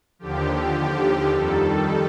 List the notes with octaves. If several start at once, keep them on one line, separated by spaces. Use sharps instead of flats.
D#2 D3 F3 G4
G4
F2 D#3 G3 A4